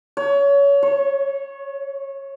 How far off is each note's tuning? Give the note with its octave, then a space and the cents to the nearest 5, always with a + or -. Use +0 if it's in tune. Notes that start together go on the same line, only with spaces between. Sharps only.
C#5 +25
C#5 -20